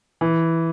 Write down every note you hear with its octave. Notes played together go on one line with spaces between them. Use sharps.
E3